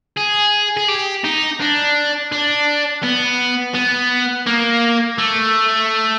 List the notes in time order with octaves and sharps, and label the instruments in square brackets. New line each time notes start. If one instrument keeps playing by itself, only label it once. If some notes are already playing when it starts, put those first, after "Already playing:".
[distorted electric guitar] G#4
G#4
G4
D#4
D4
D4
B3
B3
A#3
A3